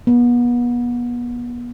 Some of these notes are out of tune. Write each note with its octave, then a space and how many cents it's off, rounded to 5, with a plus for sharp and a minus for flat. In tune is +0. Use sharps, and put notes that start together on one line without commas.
B3 -35